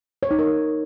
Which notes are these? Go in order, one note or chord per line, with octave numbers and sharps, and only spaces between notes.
C#5
D#4
A#4